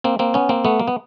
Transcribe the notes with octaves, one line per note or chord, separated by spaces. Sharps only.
A#3 C4
A#3 C4
B3 C#4
A#3 C4
A3 B3
A#3
B3